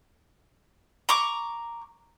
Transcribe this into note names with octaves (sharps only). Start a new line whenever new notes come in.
A#5 C#6 D6